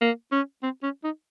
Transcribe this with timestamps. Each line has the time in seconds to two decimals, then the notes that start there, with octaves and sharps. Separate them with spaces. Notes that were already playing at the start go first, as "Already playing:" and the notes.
0.01 A#3
0.32 C#4
0.63 C4
0.83 C#4
1.04 D#4